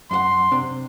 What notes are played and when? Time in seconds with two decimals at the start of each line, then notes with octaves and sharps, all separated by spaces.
0.11 F#2 F#4 F#5 C6
0.52 C3 C4 D4